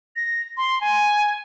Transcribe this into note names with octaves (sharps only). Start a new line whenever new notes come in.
A#6
C6
G#5